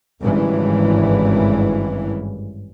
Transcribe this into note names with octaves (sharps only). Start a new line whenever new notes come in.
G#1 G2 C#3 E3